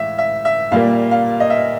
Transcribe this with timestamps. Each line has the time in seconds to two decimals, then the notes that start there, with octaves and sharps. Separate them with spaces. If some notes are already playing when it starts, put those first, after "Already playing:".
Already playing: A2 E3 G#3 E5 F5
0.18 E5
0.45 E5
0.72 A#2 G3 A#3 F5
1.11 F5
1.40 D#5
1.50 E5